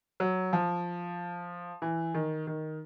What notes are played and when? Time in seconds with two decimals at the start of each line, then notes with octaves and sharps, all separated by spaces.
0.20 F#3
0.53 F3
1.82 E3
2.14 D#3
2.47 D#3